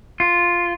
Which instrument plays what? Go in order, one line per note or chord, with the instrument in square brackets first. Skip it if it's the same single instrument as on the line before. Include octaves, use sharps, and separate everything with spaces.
[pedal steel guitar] F4